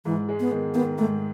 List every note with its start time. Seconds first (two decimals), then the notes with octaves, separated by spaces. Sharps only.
0.05 G#2 E3
0.29 G#3
0.40 B3
0.52 D#3
0.74 D#3 B3
0.98 G#2 A3